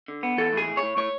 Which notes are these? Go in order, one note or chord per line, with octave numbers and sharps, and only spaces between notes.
D3
B3
E3 A4
A2 G#4
A2
C#5
A2
A2 C#5